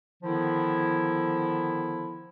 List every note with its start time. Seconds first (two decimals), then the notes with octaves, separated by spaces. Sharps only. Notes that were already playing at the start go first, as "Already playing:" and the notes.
0.23 D3 D#3 F3 B3 E4